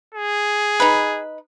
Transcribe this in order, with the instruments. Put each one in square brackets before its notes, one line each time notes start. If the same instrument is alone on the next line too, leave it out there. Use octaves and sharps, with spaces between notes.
[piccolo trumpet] G#4
[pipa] D#4 B4